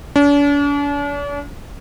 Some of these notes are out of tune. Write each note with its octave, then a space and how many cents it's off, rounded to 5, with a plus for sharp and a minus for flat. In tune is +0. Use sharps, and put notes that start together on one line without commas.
D4 -45